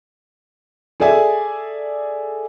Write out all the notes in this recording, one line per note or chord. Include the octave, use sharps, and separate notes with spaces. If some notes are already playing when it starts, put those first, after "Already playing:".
G#4 A4 D5 E5 G#5